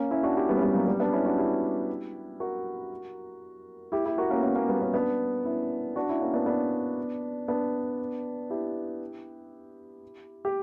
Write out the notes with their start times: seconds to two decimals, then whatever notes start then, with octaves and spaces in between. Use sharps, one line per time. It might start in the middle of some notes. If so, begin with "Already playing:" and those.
Already playing: A#3 C#4
0.11 C#4 E4
0.23 D4 F#4
0.37 E4 G4
0.49 G3 B3
0.57 C#4
0.62 G3 B3
0.74 F#3 A#3
0.87 G3 B3
1.00 B3 D4
1.13 C#4 E4
1.25 D4 F#4
1.38 E4 G4
2.40 F#4 A#4
3.92 E4 G4
4.06 E4 G4
4.18 F#4 A#4
4.30 A#3 C#4
4.37 B3
4.43 A#3 C#4
4.55 A#3 C#4
4.69 G3 B3
4.82 A#3 C#4
4.94 B3 D4
5.44 C#4 E4
5.96 D4 F#4
6.09 C#4 E4
6.21 A#3 C#4
6.33 B3 D4
6.46 B3 D4
7.48 B3 D4
8.50 E4 G4
10.45 G4